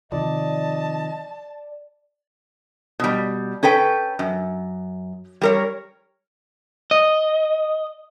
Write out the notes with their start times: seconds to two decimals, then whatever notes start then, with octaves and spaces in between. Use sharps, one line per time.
0.12 C3 D#3 F3 D5 D#5 A5
3.00 B2 G3
3.63 C#4 A4 B4 G5
4.19 F#2
5.41 G3 A#4 C#5
6.91 D#5